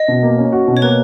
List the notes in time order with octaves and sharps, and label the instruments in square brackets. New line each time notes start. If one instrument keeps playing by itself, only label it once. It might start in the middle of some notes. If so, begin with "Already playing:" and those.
Already playing: [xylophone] D#5
[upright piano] B2
A#3
C#4
F#4
B2
[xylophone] C#5
[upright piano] A#3 [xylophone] B4